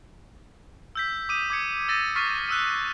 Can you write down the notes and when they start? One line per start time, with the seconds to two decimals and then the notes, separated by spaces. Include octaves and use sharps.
0.95 E6 G6 B6
1.29 D6 D#6 D#7
1.50 D6 G#6 C#7
1.88 E6 A6 A#6 D#7
2.16 C#6 F6 A6 B6 C7 D#7
2.49 D#6 E6 F#6